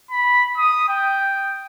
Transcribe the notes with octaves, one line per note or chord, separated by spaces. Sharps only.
B5
D#6
G5